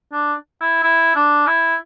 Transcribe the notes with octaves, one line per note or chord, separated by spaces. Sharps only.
D4
E4
E4
D4
E4